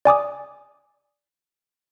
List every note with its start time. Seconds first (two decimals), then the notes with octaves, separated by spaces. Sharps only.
0.05 D5 G#5 D6 D#6